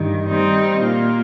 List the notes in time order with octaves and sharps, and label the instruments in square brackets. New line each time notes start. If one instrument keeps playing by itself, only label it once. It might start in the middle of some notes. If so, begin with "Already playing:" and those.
Already playing: [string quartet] G2 D#3
D#3 G3 C4 D#4
A#2 A#3 F4